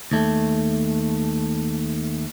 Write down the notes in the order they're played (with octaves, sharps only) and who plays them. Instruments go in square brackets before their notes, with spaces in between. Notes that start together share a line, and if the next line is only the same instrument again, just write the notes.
[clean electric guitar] D#2 A3